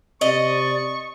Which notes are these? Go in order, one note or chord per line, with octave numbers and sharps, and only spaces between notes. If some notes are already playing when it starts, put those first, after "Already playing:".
C3 D5 D#5 C#6